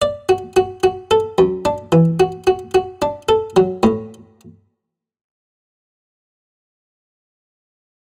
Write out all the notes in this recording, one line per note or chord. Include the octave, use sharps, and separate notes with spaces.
D5
F#4
F#4
F#4
A4
F#2
D4
E3
F#4
F#4
F#4
D4
A4
F#3
A2